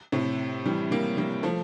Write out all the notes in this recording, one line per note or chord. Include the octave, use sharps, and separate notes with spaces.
A2 C3
E3 G3
G3 A#3
G3 A#3
F3 A3